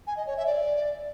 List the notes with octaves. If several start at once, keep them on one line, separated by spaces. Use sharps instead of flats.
G#5
D#5
C#5
E5
D5